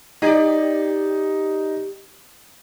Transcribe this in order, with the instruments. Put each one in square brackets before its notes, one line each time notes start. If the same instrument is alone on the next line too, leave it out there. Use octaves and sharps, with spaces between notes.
[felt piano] D#4 [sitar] G4 D5